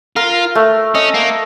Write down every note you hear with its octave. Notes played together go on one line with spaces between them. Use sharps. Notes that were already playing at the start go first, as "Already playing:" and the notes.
F4 A#4
A3
C#4 D#5
A#3